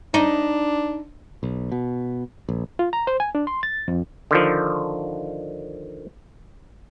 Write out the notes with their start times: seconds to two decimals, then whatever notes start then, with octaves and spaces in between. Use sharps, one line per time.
0.14 D4 D#4
1.43 B1
1.72 B2
2.49 A#1
2.79 F4
2.93 A#5
3.07 C5
3.20 G#5
3.35 D4
3.47 C6
3.63 A6
3.88 F2
4.31 D3 D#3 F3